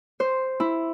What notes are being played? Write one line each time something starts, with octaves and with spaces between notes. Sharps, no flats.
C5
E4